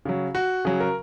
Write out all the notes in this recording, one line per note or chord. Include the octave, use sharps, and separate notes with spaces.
C#3 F#3
F#4
C#3 F#3 G#4
A#4